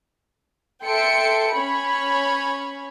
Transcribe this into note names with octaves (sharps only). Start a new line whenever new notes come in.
A4 E5 G5 C6 C#7 D7
C#4 C#5 B5